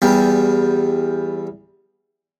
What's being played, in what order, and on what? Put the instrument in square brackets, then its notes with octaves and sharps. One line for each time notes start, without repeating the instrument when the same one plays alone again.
[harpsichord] E2 G3